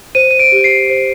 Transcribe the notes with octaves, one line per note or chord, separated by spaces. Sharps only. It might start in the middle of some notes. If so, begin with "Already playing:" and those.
C5 D#7
D#7
D7
G4
C7
C5